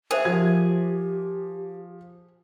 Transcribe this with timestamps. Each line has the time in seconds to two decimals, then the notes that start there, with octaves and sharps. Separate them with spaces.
0.11 G#4 A#4 C5 E5
0.25 F3 G4 G#6